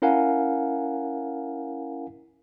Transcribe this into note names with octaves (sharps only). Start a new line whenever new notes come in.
C#4 E4 A#4 F5 F#5 G#5